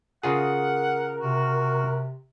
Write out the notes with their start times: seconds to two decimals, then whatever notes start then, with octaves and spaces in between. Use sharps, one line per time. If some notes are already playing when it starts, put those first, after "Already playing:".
0.23 C#3 F4 G#4 A#4 F#5
1.20 C3 F#4